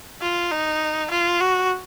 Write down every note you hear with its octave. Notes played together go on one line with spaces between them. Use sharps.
F4
D#4
F4
F#4